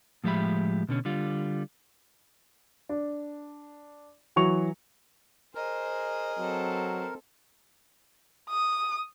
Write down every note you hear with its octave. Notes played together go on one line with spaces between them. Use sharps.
A2 F3 G#3 G4 E5 B5
B2 D3 C#4
D3 G3 F4
D4
E3 F#3 C#6 F7
G#4 A#4 C5 D#5
F#3 C4 A4
D#6